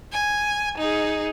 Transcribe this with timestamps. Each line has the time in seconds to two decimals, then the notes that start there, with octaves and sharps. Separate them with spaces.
0.13 G#5
0.78 D#4 G#4